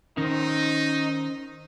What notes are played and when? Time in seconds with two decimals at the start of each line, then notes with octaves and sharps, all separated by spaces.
0.18 D#3 C#4 D#4 C5